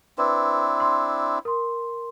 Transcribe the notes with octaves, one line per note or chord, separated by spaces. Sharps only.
C4 D4 E4 B4
C6
A#4 C6